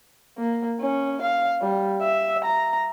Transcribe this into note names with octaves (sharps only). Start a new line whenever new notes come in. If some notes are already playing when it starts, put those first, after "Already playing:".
A#3
C#4
F5
G3
E5
A#5